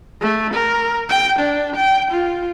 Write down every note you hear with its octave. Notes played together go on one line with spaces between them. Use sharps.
A3
A#4
G5
D4
G5
F4